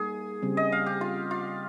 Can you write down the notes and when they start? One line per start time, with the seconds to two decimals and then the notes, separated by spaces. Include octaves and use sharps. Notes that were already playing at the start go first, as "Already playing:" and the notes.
Already playing: G3 A#3 D#4 G#4
0.42 C#3 G3 C4
0.57 D#5
0.72 F5
0.86 G4
1.01 F4
1.31 F4